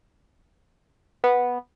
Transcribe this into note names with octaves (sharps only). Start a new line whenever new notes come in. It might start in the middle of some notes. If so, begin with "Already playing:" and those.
B3